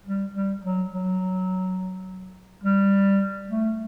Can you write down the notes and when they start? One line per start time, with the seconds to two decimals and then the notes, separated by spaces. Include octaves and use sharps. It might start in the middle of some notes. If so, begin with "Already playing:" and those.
0.06 G3
0.34 G3
0.63 F#3
0.91 F#3
2.63 G3
3.49 A3